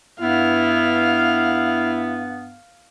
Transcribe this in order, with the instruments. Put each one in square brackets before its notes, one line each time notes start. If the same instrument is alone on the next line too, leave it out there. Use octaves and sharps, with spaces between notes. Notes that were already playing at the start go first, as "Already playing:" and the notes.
[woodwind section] G2 B3 [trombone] E4 [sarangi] F5